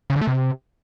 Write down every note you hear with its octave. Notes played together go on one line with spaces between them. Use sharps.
C#3
D3
A3
C3